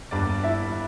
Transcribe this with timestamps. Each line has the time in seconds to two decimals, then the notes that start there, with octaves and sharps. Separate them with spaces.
0.11 G1 G2 G3 D4 D5
0.44 E4 E5